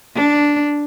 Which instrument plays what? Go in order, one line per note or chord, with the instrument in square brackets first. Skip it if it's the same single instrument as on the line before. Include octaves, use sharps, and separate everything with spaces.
[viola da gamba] D4